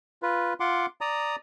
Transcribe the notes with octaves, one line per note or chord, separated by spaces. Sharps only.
F4 B4
F4 F#5 C6 D6
D5 A#5 D#6